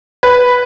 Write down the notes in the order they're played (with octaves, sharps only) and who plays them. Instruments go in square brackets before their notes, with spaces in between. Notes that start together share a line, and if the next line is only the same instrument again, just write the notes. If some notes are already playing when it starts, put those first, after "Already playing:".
[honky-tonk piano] B4